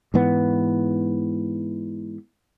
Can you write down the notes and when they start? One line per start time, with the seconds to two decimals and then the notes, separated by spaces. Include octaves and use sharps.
0.14 G#2 E3 B3